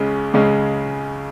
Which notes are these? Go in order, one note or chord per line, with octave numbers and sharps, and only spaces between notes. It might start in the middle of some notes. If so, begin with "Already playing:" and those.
Already playing: C#2 C#3 G#3 C#4
C#2 C#3 G#3 C#4